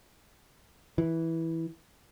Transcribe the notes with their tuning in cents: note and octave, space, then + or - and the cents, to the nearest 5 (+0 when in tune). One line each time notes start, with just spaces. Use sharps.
E3 -10